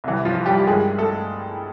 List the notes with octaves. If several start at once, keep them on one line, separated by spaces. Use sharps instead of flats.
C2 C3 E3 G3
F3 F4
G3 G4
G4
G2 D#3 G3 G#3 G#4
A3 A4